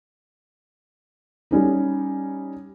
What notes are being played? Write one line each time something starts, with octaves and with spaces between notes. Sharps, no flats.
G3 C#4 D#4